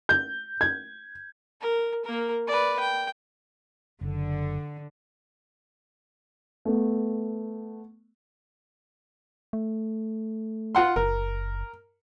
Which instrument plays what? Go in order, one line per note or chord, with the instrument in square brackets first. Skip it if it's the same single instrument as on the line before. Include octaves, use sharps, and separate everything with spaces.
[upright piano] G6
G#6
[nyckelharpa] A#4
A#3 A#4
B4 D5
G5
[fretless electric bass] F#1 [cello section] D3
[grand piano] A3 B3
[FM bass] A3
[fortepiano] F4 F#5 C6
[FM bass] F#1 [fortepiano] A#4